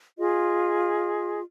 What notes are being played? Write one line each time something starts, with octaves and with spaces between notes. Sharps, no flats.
F4 G#4 D#5